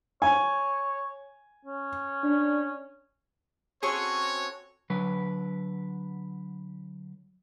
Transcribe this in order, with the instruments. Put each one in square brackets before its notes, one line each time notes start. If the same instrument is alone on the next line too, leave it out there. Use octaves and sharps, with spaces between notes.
[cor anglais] C#5 [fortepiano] G#5
[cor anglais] C#4
[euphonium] D4
[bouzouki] C4 C#4 A4 [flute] F#4 [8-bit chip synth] G#4 C#6 [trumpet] C#5
[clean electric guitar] D3 F#3 B4